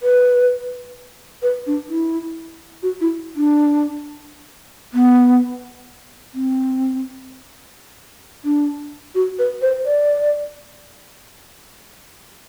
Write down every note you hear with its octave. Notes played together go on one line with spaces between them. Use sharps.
B4
B4
D4
E4
F#4
E4
D4
B3
C4
D4
F#4
B4
C5
D5